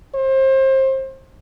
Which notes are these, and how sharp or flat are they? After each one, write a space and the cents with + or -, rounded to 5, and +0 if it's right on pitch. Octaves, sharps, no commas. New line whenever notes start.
C5 +30